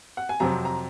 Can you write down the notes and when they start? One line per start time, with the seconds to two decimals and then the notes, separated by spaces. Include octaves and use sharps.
0.17 F#5
0.29 G#5
0.40 F2 C3 F#3 C4 A#5
0.65 A#5